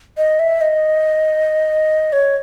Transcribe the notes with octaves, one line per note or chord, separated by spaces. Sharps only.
D#5
E5
D#5
C#5